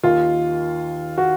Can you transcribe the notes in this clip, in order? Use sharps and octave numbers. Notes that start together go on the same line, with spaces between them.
D#2 D#3 F4
F#4